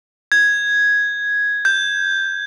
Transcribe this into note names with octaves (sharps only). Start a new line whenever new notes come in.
G#6
G6